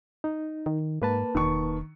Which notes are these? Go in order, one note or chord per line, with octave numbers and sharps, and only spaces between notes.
D#4
D#3
G#2 A#3 B4 A5
E1 D#3 C#6